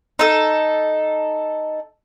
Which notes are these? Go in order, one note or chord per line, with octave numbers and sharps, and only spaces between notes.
D#4 A4